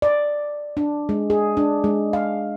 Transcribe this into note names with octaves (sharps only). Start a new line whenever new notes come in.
D5
D4
G#3
G#4
D4
G#3
F5